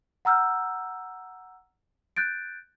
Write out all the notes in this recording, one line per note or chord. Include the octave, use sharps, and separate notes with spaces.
F#5 A#5 E6 F6 G6
F#6 G6 A6 D7